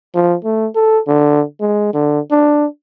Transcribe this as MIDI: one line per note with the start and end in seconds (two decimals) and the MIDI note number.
0.15 0.35 53
0.44 0.67 57
0.75 0.99 69
1.07 1.43 50
1.60 1.91 56
1.94 2.20 50
2.31 2.66 62